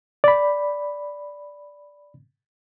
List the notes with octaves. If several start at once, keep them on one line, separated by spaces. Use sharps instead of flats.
D5 B5